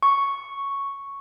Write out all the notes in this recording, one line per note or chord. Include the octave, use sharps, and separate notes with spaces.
C#6